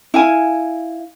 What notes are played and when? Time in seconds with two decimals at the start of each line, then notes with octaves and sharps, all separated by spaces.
0.14 E4 F5 G#5